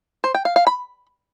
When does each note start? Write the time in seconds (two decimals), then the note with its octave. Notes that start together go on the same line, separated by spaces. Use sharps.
0.24 C5
0.34 G5
0.45 F5
0.56 F5
0.67 B5